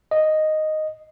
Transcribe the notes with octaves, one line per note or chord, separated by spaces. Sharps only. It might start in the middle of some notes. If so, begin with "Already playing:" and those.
D#5